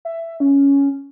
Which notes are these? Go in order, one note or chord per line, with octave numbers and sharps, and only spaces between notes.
E5
C#4